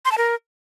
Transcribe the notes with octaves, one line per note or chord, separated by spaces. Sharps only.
C6
A5
A#4